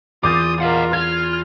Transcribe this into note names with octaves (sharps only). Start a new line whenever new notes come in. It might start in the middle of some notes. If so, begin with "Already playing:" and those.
E2 F4 D6 D#6 G6 A6
F4 A#4 D#5 F#5
F4 F6 G#6